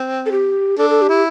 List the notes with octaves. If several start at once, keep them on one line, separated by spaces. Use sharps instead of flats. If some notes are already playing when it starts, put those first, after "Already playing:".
Already playing: C4
A4
G4
D4 A4
A4
G4
E4